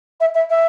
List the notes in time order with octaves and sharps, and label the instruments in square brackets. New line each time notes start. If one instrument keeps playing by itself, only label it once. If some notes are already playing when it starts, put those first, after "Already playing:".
[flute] E5
E5
E5